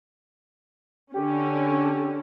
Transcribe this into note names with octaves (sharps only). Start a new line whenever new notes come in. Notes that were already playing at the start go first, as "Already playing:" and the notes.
D3 C#4 G4